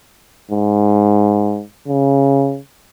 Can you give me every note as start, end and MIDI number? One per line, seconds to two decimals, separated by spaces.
0.51 1.62 44
1.88 2.59 49